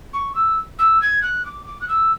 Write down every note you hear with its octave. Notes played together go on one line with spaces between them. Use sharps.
C#6
E6
E6
G#6
F#6
D6
D6
F#6
E6